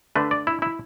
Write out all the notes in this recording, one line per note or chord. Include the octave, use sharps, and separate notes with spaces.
D3 A3 D4 B4
D5
E4
E4